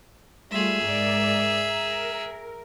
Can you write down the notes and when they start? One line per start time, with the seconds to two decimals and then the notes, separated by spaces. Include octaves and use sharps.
0.51 G3 A3 F4 G#4 E5
0.84 G#2 A#4 D5
1.66 A#4